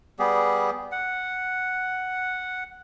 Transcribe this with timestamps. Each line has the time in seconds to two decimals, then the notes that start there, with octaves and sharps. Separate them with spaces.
0.19 G3 B3 G4 G#4
0.92 F#5